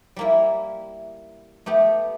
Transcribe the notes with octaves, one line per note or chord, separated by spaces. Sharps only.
G3 A#3 E4
A3 B3 G4